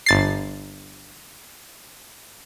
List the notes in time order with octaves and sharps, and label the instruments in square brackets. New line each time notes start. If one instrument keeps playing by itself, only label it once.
[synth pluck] G1 A6 C7